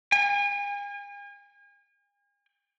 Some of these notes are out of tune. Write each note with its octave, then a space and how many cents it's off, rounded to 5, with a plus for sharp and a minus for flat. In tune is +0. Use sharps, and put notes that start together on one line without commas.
G#5 -40